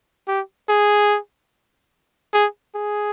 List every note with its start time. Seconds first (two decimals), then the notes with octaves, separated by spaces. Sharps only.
0.28 G4
0.69 G#4
2.34 G#4
2.75 G#4